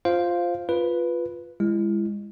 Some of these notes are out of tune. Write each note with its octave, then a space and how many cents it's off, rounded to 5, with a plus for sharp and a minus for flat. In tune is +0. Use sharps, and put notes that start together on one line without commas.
F4 +0 C5 +0 F5 +0
F4 +0 B4 +0
G#3 -25 E4 +30